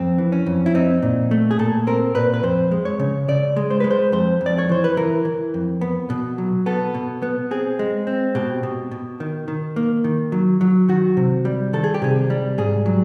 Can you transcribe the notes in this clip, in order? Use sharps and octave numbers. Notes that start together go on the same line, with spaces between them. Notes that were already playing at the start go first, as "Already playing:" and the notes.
Already playing: F2 C4
E3
C#4
F2
E4
C4 D#4
A#2
A3
G#4
A#2 A4
C4 A#4
A#2 B4
B4
F2 C5
G#3
C#5
C#3
C#3 D5
G#3
C5
G#3 B4
C5
F2 C5
F2
D5
C#5
E3 C5
B4
E3 A#4
E3
F2
B3
B2
F#3
B3 A4
B2
B3
C4 G#4
G#3
C4
B2 G4
B2
B2
D#3
D#3
A#3
D#3
F#3
F#3
D#3 F#4
C3
G3
D#3 A4
G#4
G4
C3 G#4
G3
G#2 G#4
F#3